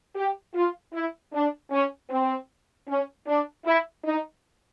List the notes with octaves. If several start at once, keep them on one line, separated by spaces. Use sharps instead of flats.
G4
F4
E4
D4
C#4
C4
C#4
D4
E4
D#4